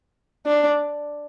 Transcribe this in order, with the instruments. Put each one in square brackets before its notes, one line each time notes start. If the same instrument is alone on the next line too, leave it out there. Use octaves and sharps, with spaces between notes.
[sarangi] D4